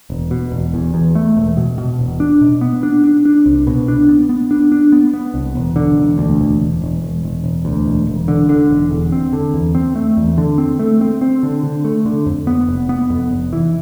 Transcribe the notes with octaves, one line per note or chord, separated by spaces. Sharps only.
E1
B2
E1
E2
E2
A3
E1
B2
B2
E1
D4
B2
B3
D4
D4
D4
C2
B2
D4
B3
B3
D4
D4
B3
B3
C2
E1
D3
E1
D2
E1
E1
E1
E1
E1
E1
D2
E1
E1
D3
D3
E1
E2
C4
D3
E2
C4
A3
E2
D3
C4
A3
C4
C4
D3
D3
A3
D3
F2
B3
F1
B3
F2
F1
E3